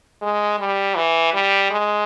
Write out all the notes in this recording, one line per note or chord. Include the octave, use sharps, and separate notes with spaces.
G#3
G3
E3
G3
G#3